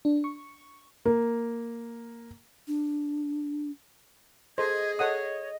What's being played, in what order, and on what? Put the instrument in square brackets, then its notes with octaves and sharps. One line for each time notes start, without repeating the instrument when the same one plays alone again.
[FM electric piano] D4
C#6
[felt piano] A#3
[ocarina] D4
[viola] G#4 [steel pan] A4 C5 [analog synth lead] D#5 [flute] G#6
[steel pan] A4 F#5 D#6 [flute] C#5